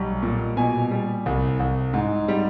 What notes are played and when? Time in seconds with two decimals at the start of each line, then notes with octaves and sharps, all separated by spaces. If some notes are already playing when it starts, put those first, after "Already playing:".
Already playing: B1 G3
0.23 A#2
0.57 B2 G#5
0.91 G3
1.26 C2
1.60 C2
1.93 G#2
2.28 G3